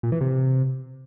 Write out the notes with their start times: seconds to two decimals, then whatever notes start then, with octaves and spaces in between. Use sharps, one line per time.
0.03 A#2
0.12 E3
0.21 C3